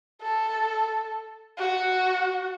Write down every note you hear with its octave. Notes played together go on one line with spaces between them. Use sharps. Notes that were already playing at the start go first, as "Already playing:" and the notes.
A4
F#4